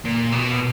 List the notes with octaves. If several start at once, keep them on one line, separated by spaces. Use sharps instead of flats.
A#2
B2